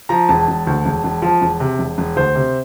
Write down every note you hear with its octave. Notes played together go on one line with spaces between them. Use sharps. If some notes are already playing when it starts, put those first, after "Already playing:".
F3 A#5
E1 A5
E1
D2
E1
E1
F3
E1
C3
E1
E1
D2 C5
C3